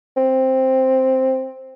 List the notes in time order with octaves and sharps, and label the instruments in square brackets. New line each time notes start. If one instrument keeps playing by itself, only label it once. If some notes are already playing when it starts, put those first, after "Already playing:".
[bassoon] C4